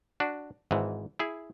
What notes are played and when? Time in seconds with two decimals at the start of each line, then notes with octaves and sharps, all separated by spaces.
0.20 D4 F#4
0.71 G#1 G#2 E3
1.19 E4 G#4